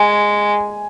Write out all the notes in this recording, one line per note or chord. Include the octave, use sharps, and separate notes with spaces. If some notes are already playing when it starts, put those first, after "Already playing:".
Already playing: G#3 G#5